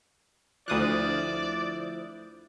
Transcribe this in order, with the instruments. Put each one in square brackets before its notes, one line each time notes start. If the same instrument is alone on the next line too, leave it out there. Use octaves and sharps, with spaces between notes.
[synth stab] D2 D#6 F#6 [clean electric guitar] F3 E4 [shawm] D5